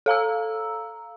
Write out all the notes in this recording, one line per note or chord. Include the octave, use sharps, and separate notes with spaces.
A4 F5 A#5 E6